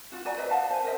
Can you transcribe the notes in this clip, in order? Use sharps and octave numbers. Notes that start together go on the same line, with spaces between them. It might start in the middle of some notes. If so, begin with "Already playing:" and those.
F4 F#4
F#4 D5 G#5 A#5
B4 C5 D#5 E5
F5 F#5 A5
C5 G#5
A#4 C5 D#5 E5